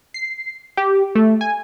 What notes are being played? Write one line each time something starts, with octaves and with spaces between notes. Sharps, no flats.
C7
G4
A3
G#5